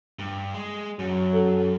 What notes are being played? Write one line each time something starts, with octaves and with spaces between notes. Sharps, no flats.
G2
G#3
F#2 F#3
A4